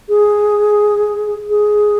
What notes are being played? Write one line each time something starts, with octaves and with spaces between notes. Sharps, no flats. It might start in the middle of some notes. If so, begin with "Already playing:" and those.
G#4
G#4